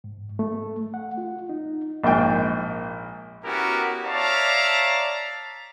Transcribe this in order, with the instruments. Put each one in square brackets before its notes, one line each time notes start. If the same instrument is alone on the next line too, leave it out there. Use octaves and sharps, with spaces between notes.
[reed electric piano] G#2
A3
F#5
F4
D#4
[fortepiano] A#1 G#2 G5
[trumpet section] B3 C#4 E4 F#4 G4 A#4
C#5 D5 E5 F5 A5 A#5